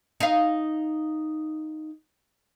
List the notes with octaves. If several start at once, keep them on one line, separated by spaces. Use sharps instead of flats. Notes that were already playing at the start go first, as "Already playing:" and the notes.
D#4 F5